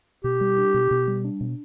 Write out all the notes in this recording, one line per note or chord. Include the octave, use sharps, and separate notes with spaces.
B2 G4
G3
D4
B2
B2
G3
D4
B2